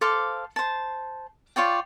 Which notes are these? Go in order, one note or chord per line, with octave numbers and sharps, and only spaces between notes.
A4 C5 F5 D6
C5 A5
F4 C#5 D5 G5